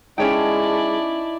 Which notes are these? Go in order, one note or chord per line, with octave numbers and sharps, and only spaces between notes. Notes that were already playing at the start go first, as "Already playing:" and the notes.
G#3 C#4 D#4 E4 A4 C#5 D5 G5